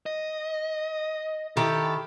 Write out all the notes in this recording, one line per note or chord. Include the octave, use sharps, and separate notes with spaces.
D#5
D#3 E4 G4 A4